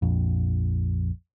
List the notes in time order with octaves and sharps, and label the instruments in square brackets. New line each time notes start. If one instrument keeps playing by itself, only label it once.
[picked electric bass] A#1 F2